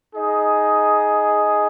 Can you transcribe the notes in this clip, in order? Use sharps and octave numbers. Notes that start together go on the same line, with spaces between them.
D#4 G#4 D#5